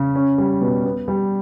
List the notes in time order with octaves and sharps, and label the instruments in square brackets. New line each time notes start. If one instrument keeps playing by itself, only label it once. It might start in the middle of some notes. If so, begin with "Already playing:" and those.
Already playing: [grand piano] C#3
C#4
G3
B2
B3
G3